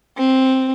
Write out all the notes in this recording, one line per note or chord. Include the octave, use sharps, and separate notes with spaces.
C4